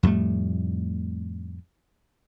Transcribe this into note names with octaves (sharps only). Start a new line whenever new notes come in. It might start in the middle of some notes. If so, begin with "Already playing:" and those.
F2 A2 G3 A3